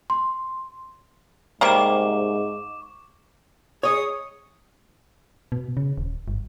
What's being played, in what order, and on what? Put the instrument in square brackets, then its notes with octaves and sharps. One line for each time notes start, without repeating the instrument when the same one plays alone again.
[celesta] C6
[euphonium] G#2 [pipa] C3 G3 A#3 [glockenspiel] C#6 D6 E7
[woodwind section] G#4 C#6 D#6 [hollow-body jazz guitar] C#5 D#5
[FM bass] B2
C#3
D#1
G1